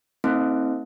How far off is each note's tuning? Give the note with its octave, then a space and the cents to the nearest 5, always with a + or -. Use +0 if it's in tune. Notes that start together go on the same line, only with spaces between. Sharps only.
A3 +40 C4 +5 D#4 +40